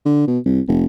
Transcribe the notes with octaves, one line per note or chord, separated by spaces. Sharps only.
D3
B2
C2
F1